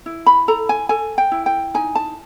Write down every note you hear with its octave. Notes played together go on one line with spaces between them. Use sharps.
E4
B5
A4 A#5
G#5
A4 G#5
G5
E4
G5
D#4 G#5
A5